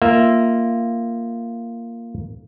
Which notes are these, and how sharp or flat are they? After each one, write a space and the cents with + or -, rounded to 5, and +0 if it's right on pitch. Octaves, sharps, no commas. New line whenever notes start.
A#3 -5 F4 -5 E5 +0